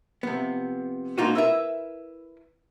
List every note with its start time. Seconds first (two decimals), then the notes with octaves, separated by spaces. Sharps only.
0.23 C3 F3 B3
1.18 G#3 A#3 D4 D#4 F4 F#4
1.35 E4 A#4 B4 D#5 E5